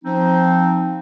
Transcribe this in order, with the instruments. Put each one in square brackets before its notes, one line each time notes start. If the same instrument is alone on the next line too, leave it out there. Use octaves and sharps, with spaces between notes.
[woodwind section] F3 C4 D#4